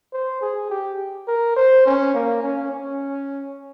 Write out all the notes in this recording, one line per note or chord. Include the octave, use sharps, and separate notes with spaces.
C5
G#4
G4
A#4
C5
C#4
A#3
C#4
C#4